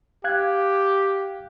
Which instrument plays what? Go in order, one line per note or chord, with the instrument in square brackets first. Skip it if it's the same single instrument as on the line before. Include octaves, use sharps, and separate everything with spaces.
[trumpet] G4 [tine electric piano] F5 F#6 G#6